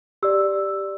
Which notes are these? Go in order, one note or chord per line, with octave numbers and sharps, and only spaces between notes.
G4 D5 E6